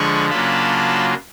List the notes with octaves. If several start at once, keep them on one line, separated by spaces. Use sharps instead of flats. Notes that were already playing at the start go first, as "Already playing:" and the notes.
Already playing: D3 F3 G#3 B5 C#6
C#3 F#3 A#3 D4 F4 A5 B5